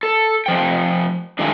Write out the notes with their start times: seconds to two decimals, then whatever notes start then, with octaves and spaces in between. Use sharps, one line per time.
0.03 A4
0.46 C3 F3 G5
1.39 F#2 D#3 G#3 D4 F4 A#4